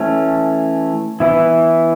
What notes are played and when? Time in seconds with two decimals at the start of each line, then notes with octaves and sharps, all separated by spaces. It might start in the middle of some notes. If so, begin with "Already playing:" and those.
Already playing: E3 A3 C#4
1.20 E3 B3 E4